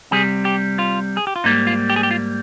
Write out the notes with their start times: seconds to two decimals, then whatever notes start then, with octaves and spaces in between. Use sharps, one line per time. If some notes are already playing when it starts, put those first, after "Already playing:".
0.11 C2 C3 G3 G#4
0.45 G4
0.79 F4
1.17 G#4
1.27 G4
1.36 F4
1.44 G#2 G3 A#3 D#4
1.67 F4
1.90 G4
1.96 G#4
2.03 G4
2.11 F4